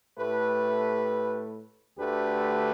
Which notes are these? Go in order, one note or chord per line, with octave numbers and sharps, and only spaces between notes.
A2 A3 G4 B4
D2 D3 A3 G4 B4